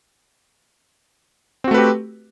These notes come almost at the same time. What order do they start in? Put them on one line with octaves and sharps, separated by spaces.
C4 F#4 A3 B4 G4